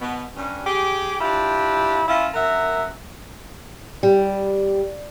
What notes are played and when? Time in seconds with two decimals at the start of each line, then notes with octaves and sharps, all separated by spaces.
0.02 B2 B3
0.36 G2 C#4
0.66 G4 G#4
1.21 D4 E4 F4 G4
2.08 C#4 E4 F4
2.34 F#2 A#4 E5 F#5
4.03 G3